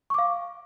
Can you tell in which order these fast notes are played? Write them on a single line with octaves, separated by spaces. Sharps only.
C#6 D6 F5